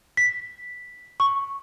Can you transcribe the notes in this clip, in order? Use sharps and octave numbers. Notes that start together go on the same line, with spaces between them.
B6
C#6